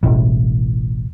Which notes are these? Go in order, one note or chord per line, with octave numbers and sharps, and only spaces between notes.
E1 A1